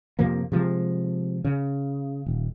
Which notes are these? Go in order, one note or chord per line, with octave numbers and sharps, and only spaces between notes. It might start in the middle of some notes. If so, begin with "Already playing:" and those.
F2 C3 F3 A#3
C3 F3 G#3
C#3
D#1